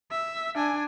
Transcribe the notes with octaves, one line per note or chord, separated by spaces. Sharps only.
E5
D4 G#5